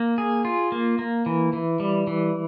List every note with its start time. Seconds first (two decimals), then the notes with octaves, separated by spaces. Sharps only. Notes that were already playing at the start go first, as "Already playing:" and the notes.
Already playing: A#3
0.18 G#4
0.45 F4
0.72 A#3
0.99 A#3
1.26 E3
1.53 E3
1.80 G3
2.07 E3